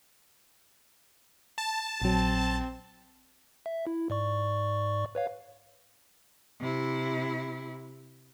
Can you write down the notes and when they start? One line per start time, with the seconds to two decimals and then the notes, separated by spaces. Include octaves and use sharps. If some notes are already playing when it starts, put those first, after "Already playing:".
1.58 A5
2.02 A#1 F#3 C4
3.66 E5
3.87 E4
4.10 G#2 D5 C#6
5.15 B4 C#5 F5
6.60 C3 E4